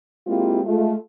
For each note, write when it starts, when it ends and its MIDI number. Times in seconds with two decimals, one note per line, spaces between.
0.27 0.61 56
0.27 0.61 58
0.27 0.61 60
0.27 0.61 64
0.27 0.61 65
0.27 0.61 67
0.63 0.95 56
0.63 0.95 57
0.63 0.95 65